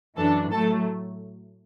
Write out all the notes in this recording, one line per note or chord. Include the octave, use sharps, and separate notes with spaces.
F#2 E3 D4 A4 A5
A2 F#3 A3 A4 A5